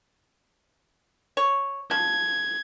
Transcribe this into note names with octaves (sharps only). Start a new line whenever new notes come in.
C#5
F3 G#6